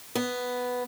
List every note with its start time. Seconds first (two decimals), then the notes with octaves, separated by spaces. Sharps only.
0.15 B3